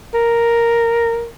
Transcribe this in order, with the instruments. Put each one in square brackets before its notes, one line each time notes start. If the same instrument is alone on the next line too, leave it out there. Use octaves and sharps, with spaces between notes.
[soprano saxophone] A#4